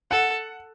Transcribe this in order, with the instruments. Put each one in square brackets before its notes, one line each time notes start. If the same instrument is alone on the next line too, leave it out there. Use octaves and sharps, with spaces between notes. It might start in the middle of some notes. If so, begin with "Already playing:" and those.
[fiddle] A4 [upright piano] F#5